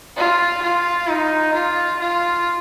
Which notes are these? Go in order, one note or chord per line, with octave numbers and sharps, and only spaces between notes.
F4
F4
D#4
F4
F4